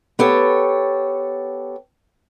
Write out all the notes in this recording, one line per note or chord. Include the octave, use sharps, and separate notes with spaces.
B3 G4 A4 C#5